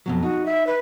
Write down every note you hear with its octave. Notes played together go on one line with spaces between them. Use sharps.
F2 B2 F#3
D#4 F#4
E5
B4